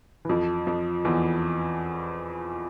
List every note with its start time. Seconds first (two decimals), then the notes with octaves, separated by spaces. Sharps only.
0.25 E3
0.29 F2 F3
0.67 F2 F3
1.05 E2 E3